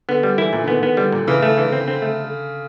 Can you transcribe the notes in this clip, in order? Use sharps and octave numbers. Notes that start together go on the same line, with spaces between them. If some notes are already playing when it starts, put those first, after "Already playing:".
D3 B3
G3
E3 E4
A#2
D3
D#3 B3
B3
D3 G3
A#2
C#3 E3
A3
D3 E3
C4
D3 C4
A3